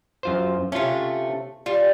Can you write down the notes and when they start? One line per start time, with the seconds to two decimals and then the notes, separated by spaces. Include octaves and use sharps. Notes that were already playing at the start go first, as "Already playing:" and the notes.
0.23 F#2 F4 C5
0.72 C3 A3 C#4 F4
1.66 G3 F4